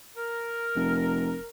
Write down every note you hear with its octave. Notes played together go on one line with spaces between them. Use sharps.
A#4
F1